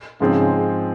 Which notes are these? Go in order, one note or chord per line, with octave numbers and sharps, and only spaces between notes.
G#2 C#3 F3 G#3 C4